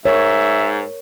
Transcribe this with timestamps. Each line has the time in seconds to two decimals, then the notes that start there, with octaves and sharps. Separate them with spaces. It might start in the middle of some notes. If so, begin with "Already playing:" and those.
0.05 G#2 A#4 C#5 E5